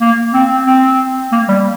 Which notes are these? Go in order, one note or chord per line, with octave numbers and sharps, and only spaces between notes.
A#3
C4
C4
A#3
G3